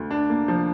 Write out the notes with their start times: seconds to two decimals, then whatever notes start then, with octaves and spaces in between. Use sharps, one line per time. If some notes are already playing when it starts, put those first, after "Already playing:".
Already playing: D2
0.11 D4
0.30 A#3
0.48 F3